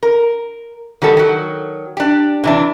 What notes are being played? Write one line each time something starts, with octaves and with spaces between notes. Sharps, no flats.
A#4
D#3 G3 F#4 A4
D#3 F#3
D4 G4
C3 E3 D4